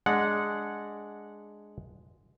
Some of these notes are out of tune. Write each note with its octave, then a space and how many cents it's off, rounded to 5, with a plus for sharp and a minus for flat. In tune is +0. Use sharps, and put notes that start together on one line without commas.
G#3 +0 D4 +0 F#5 -10